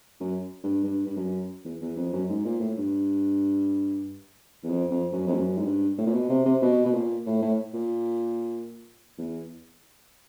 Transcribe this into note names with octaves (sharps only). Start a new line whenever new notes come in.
F#2
G2
G2
G2
F#2
E2
E2
F2
F#2
G#2
A#2
A2
G2
E2
F2
F2
F#2
F2
F#2
G#2
G2
A2
A#2
B2
C3
C3
B2
B2
A#2
A2
A2
A#2
E2